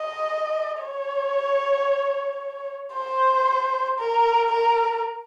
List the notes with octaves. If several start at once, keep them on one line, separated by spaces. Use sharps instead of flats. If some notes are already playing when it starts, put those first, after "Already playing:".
Already playing: D#5
C#5
C5
A#4
A#4